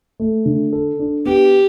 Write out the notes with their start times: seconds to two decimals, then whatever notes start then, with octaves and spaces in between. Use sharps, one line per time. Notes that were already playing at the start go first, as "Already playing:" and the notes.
0.19 A3
0.46 D3
0.73 A4
0.99 D4
1.26 B3 G4